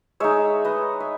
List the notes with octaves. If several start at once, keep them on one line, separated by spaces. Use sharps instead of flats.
G#3 D#4 C#5 E5
B4 D#5
E5